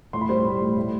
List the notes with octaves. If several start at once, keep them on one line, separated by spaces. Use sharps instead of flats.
A2 C6
B5
G3 C5 C6
A2
A2
A2